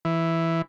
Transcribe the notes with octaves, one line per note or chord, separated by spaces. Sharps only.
E3